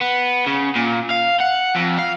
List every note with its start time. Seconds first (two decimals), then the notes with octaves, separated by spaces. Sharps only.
0.01 B3
0.46 C#3
0.76 A#2
1.11 F5
1.40 F#5
1.75 F2
1.99 F5